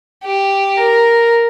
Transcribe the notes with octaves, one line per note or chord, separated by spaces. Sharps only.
G4
A#4